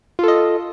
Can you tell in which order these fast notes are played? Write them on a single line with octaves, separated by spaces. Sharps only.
F4 A4 D#5